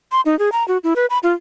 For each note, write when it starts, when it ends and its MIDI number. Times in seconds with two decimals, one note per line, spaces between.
0.12 0.21 84
0.26 0.38 63
0.39 0.52 68
0.52 0.66 82
0.68 0.78 66
0.84 0.94 64
0.96 1.06 71
1.10 1.18 83
1.23 1.33 65